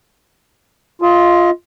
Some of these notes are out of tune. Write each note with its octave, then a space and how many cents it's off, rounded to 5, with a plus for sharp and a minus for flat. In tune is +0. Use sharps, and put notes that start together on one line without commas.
F4 +0 D#5 +30